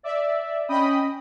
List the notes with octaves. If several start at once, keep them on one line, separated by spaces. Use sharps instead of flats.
D5 E5
C#4 D#5 G5 B5 D#6